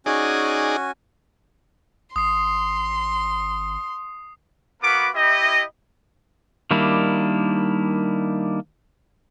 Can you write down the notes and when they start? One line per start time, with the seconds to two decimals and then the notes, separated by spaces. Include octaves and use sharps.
0.06 C#4 D#4 F#4 G#4 D5 G#5
2.16 G#1 C6 D#6 C7
4.82 A#3 B3 F#4 A#4 B4 D6
5.15 E4 G4 D#5
6.71 D#3 G3 A#3 D4 E4